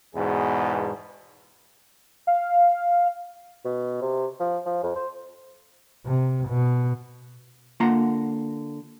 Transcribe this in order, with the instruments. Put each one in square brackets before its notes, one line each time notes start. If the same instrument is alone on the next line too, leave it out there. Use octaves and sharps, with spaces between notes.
[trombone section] E2 G#2 B2 G#4
[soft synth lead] F5
[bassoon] B2
C3
F3
F3
F2
C5
[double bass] C3
B2
[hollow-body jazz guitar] D3 A#3 F4 F5 F#5 A#5